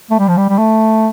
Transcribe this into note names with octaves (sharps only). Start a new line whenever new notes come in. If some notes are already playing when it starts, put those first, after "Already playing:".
A3
G3
F3
G3
G3
A3